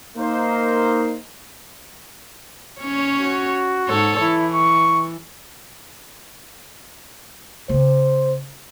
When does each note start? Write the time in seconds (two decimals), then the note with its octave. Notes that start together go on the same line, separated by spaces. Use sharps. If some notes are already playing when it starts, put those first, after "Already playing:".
0.18 A#3 D#4 A#4 C5
2.81 C#4 C#5
3.19 F#4
3.88 G#2 A4 C#5
4.21 E3 E4
4.54 C#6
7.69 C#3 B3 C5